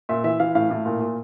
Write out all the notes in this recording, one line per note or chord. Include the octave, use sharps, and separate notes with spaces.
A#2 E5
E3 E5
E3 F5
A2 F5
A2
A#2
A#2